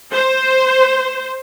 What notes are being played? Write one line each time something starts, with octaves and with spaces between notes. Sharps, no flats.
C5